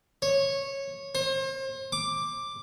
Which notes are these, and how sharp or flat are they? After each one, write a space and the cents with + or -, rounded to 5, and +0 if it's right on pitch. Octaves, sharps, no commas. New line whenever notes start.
C#5 -15
C5 +40
D6 +5